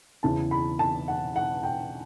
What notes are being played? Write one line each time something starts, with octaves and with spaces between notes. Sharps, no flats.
E2 C#3 E3 A5
B5
A5
F#5
F#5
G5